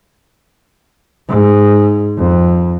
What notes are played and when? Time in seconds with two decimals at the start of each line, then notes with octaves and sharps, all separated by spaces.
1.29 G#2
2.18 F2